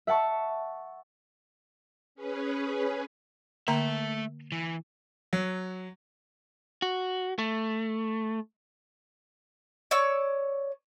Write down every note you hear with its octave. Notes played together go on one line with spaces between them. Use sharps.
E5 F#5 A5 C#6
C#4 G#4 B4
D3 A3 A#3 E5 A#5
E3
F#3
F#4
A3
C#5 D5 C#6 E6